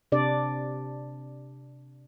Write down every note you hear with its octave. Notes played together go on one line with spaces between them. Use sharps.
C3 D4 D5